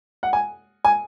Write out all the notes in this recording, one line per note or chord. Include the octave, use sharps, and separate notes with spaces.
F#5
G#5
G#5